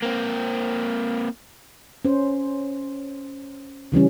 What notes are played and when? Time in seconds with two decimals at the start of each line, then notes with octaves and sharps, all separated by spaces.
0.03 A#3 C4
2.05 C#4 C5
3.92 C#3 E3 G3 C#4